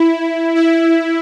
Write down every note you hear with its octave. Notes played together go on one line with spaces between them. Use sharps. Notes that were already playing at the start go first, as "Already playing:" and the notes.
Already playing: E4
E4